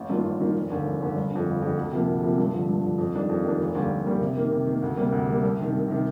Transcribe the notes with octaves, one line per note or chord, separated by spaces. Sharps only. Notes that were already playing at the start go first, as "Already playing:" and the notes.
Already playing: A1
G2 D#3 A#3 F4
A1
G2 D#3 A#3 F4
F1
D#2 D3
F1
D#2 D3
G1
F2 D3
G1
F2 D3
D2
C3 F3 A#3
D2
C3 F3 A#3
G2
D3 F3
G2
D3 F3
F2
D#3 G3 D4
F2
D#3 G3 D4
F1
D#2 D3 G3 A#3
F1
D#2 D3 G3 A#3
C3
D#3 A#3
C3
D#3 A#3
D2
C3 G3 A#3
D2
C3 G3 A#3
C2
C3 D#3
C2
C3 D#3